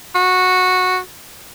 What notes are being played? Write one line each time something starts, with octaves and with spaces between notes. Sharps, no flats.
F#4